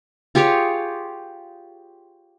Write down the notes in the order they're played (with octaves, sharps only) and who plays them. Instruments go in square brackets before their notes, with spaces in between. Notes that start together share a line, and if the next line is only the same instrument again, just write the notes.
[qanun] F4 G4 G#4 C#5